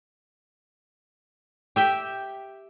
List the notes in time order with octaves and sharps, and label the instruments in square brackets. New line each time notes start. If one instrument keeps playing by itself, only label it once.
[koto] G4 E5 G5